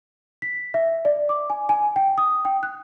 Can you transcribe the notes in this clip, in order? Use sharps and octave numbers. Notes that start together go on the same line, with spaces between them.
B6
E5
D5
D6
G#5
G#5
G5
D#6
G5
F#6